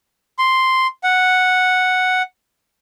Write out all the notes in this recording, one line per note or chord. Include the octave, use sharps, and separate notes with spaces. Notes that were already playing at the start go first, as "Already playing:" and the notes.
C6
F#5